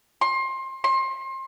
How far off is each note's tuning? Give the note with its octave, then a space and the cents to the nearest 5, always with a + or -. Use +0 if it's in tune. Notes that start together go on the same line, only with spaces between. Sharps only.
C6 +25
C6 +30